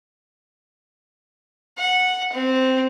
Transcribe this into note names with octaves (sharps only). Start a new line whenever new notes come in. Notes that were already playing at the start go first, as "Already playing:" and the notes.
F#5
C4